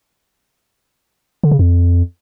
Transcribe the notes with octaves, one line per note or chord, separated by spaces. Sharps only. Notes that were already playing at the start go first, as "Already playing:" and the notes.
D3
C#3
F2